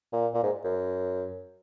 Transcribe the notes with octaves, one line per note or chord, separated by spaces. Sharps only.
A#2
A#2
G#2
F#2